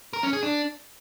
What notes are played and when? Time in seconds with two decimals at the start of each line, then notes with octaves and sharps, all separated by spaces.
0.13 A#4
0.23 C#4
0.33 G#4
0.43 D4